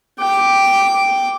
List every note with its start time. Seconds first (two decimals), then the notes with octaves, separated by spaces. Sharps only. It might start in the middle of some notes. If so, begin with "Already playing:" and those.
0.19 G5 D6